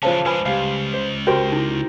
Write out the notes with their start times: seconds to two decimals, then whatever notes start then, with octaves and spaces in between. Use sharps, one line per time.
0.03 C#3 E3 F3 C#4 C5 A5
0.26 G#3 D4 B4 G#5 B5
0.46 C#2 G3 F5
0.94 C5
1.27 F#4 G4 A#4 C5 G5
1.52 D#4 E4